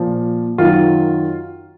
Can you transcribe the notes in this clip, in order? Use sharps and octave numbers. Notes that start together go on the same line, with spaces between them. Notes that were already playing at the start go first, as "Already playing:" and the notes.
Already playing: A#2 F3
F#2 D#3 F#3 F4